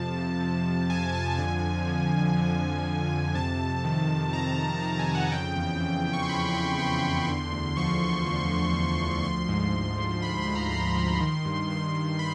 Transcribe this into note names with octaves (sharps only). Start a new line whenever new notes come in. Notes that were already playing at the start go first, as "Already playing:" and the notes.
Already playing: F2 C3 F3 A5
F2
C3
F2
F3 G#5
F2 A5
D3 G#5
F2
F3
F2
D3
F2
F3
F2
C3 A5
F2
D#3
F2
C3 A#5
F2
D#3 A5
G#5
F2
F#5
C#3 G5
E2
E3
E2
C#6
C6
C#3 B5
C#6
E2 C6
E3 C6
E2
D3
D2
F3 C#6
D2
D3
D2
F3
D2
F3 C6
G#2
G#2
F3
F3 B5
C6
G#2
A#5
G#2 C6
F3
D#3
G2
G2 C6
D#3
D#3 B5